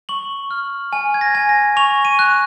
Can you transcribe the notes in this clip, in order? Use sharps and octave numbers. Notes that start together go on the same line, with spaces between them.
C#6 F#7
F6
G#5
G#6
A#6
G#5
A#6
C#6 F7
D#7
F#6